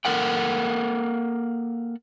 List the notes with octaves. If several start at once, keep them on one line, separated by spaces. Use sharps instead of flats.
A#3 A4 A#4 F#5 G5